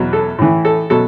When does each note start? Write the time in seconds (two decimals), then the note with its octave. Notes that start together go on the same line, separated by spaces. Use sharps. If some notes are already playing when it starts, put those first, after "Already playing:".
Already playing: E2 B2 F#3
0.13 A4
0.39 A2 E3
0.65 A4
0.90 B2 F#3 A4